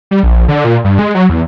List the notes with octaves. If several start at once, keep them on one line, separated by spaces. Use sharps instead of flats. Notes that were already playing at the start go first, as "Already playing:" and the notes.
G3
A#1
D3
A#2
G2
G#3
F#3
E2